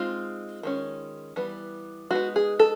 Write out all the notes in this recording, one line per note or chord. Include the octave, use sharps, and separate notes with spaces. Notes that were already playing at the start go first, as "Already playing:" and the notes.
Already playing: G#3 C4 D#4 F4
D#3 G#3 C#4
E3 G3 B3
G#3 B3 D#4 F#4
G#4
A4